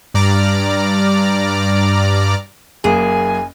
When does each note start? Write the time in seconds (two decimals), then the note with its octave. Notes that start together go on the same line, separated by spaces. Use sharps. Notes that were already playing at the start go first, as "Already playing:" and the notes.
0.14 G2 D5 A#5 D6 F6
2.84 F#1 A#3 G#4 G#5